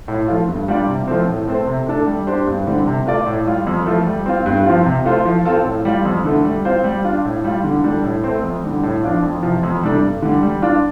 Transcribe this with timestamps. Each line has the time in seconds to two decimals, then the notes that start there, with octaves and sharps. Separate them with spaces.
0.08 A2
0.28 F3 A3 F4
0.48 G2
0.68 G3 D4 F4 D5
0.88 C3
1.08 F3 A3 C4
1.28 A2
1.47 A3 C4 A4 C5
1.67 C3
1.87 A3 D4 A4
2.07 G3
2.27 D4 G4 C5
2.47 G2
2.67 D3 G3 C4
2.87 C3
3.07 A3 F4 D5
3.26 A2
3.46 G3 F4
3.67 F2
3.86 F3 A3
4.07 G3
4.26 C4 F4
4.46 G2
4.65 F3 C4 F4
4.85 C3
5.06 A3 F4 C5
5.25 F3
5.45 C4 F4 A4
5.65 A2
5.85 G3 F4
6.05 F2
6.25 D3 A3
6.45 G3
6.65 C4 F4 C5
6.84 G3
7.04 D4 F4
7.25 A2
7.44 G3 F4
7.64 D3
7.84 G3 D4 A4
8.04 A2
8.24 A3 C4
8.43 F2
8.63 D3 G3
8.83 A2
9.03 F3 D4 F4
9.23 F2
9.43 C3 F3
9.63 F2
9.82 C3 G3 D4 A4
10.03 G2
10.22 D3 G3
10.43 G3
10.62 D4 F4